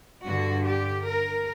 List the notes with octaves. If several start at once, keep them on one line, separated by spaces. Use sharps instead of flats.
G2 D3 F#4
G4
A#4